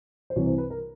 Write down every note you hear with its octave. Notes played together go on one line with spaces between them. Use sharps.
C5
C2 C3 E3 C#5
C5
B4
A#4